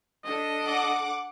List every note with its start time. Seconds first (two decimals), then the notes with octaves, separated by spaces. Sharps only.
0.24 D4 A4 D#5
0.65 F#5 D6